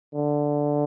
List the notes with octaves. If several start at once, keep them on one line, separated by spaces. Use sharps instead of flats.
D3